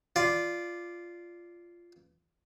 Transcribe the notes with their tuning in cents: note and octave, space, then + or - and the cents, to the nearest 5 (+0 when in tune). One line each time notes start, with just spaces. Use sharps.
F4 -10 D5 +0